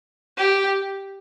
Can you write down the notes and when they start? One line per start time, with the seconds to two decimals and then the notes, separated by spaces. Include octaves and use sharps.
0.37 G4